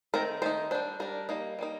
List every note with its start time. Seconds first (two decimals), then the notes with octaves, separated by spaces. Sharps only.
0.14 D#3 A3 C4 D#4 A#4
0.42 D#3 A3 D#4 C5
0.71 G3 D4 C5
1.00 G3 D4 A#4
1.29 G3 A#3 D#4
1.59 G3 A#3 D#4